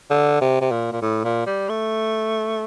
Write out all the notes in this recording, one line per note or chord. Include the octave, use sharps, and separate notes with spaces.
D3
C3
C3
A#2
A#2
A2
A#2
G3
A3